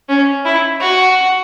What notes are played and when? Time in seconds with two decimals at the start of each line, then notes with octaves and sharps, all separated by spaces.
0.09 C#4
0.45 E4
0.80 F#4